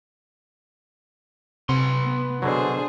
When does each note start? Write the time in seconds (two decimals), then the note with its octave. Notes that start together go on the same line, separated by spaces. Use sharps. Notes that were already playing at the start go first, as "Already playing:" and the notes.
1.69 C3 B4 F#5 C6
2.02 B3
2.42 B2 D3 F#3 D4 G#4 C5